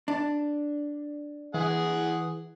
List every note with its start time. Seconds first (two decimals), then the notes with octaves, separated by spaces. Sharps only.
0.08 D4
1.54 E3 G#4 F#5